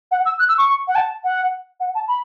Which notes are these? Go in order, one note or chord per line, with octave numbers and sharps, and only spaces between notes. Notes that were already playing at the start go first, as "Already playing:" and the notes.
F#5
E6
F#6
E6
C#6
F#5
A5
F#5
F#5
A5
B5